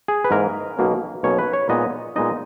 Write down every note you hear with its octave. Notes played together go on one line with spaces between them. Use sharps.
G#4
B4
G#2 E3 A#3 A#4
B1 B2 A#3 C#4
B1 B2 A#3 C#4 C#5
B4
C#5
A#2 G#3 B3 D#4 D#5
A#2 G#3 B3 D#4 D#5